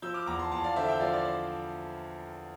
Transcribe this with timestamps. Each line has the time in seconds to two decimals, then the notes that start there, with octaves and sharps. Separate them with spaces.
0.02 F3 E6 G6
0.14 D6 F6
0.26 E2 A#5 D6
0.39 A5 C6
0.51 E2 A5 C6
0.64 D5 F5
0.76 D3 C5 E5
0.88 E5 G5
1.00 F3 D5 F5
1.13 D5
1.25 D5